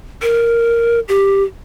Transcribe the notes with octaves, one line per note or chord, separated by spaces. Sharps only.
A#4
G4